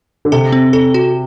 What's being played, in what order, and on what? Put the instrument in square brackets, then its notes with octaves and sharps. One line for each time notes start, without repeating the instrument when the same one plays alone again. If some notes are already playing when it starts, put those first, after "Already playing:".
[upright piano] D3
[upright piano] C3 [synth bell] A4
[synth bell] C4
A4
F#4